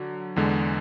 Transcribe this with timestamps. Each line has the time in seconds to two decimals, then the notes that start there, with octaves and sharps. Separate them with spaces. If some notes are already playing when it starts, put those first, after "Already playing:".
Already playing: D3 F#3
0.36 E2 D3 G#3